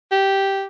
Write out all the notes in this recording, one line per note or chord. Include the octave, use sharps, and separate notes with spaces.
G4